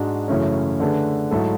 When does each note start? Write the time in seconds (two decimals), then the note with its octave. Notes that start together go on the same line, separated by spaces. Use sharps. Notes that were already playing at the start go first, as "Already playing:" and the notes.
Already playing: G#2 G#3 D4 F#4
0.28 F#2 C#3 E3 A3 C#4
0.80 D3 A3 D4 G#4 B4
1.31 G#2 F#3 A3 E4 A4